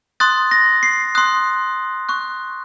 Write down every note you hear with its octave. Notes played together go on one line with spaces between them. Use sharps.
C6 D#6 F#6 A6
A#6
C7
C6 D#6 F#6
C#6 F#6